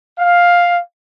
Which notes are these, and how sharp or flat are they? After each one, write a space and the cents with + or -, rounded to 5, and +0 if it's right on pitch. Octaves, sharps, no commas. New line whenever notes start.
F5 +5